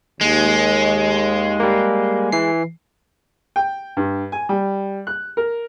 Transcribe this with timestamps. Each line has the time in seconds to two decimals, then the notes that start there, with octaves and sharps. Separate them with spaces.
0.21 D#2 G#3
1.60 G3 A#3
2.32 E3 C7
3.56 G5
3.97 G2
4.32 G#5
4.49 G3
5.07 F#6
5.37 A#4